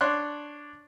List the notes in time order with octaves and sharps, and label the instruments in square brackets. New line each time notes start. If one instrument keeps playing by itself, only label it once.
[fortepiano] D4 C#5 C6 F#6